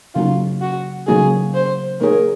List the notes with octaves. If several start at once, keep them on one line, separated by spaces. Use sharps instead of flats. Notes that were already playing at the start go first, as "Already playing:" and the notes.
C#3 F#3 A#3 D#4 F4 F#4
F#4
C#3 F#3 A#3 D#4 F#4 G#4
C5
A#3 D#4 G#4 A#4 C#5